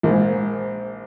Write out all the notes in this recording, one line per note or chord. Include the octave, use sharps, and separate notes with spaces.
A#1 G#2